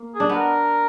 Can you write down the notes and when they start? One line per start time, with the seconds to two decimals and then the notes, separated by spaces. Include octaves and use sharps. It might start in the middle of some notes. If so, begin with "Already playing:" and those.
Already playing: A#3
0.15 G#4
0.20 D4
0.30 B3
0.35 A#4